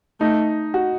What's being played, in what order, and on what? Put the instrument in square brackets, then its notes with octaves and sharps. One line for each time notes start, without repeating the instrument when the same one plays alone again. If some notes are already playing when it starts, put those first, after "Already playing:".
[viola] A3 [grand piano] D#4
[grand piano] F#4